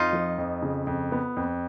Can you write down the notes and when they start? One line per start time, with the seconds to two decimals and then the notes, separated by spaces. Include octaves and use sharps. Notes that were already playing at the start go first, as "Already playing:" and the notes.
Already playing: F2 D#4 F4
0.13 F3
0.38 F2
0.62 C#3
0.87 F2
1.12 B3
1.37 F2